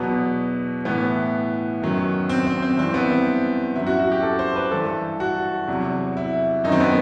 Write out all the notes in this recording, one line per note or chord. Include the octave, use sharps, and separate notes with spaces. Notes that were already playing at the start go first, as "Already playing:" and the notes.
Already playing: E2 B2 F#3 B3
A2 E3 B3
F#2 D#3 F#3
C4
C4
C4
G2 E3 C4
B3
C4
F#2 F#3 E4
F#4
F#4
G4
A4
C5
B4
G2 E3 A4
F#4
E2 C3 F#3
E4
F#2 D#3 F#3 D#4
C4
B3